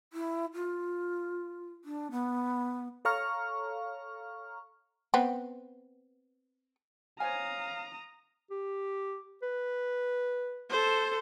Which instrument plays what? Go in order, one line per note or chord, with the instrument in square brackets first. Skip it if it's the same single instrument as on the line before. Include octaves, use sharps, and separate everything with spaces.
[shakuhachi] E4
F4
D4
B3
[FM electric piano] A4 C#5 F5 A#5 C#6 F6
[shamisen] B3 C4
[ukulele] C5 C#5 G#5 [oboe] F5 [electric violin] A#5 D#6
[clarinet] G4
B4
[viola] A4 C5